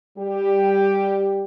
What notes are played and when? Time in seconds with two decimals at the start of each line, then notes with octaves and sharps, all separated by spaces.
0.18 G3 G4